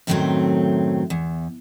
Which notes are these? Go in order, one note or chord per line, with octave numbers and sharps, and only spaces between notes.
F#2 A2 D#3 F#3 A3 C4
E2